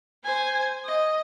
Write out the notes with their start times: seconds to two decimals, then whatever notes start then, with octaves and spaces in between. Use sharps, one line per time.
0.24 C5 G#5
0.84 D#5